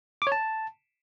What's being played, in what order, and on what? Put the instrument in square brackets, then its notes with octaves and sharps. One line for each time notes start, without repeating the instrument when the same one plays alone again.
[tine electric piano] D6
C#5
A5